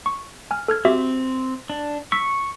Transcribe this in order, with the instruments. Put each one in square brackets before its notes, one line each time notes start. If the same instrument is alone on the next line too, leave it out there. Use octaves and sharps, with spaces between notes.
[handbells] C#6
G#5 F6
A4 F6 G#6
[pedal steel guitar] C4 [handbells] F#4 G4 E5
[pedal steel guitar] D4
[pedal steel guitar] C#6 [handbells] E6 B6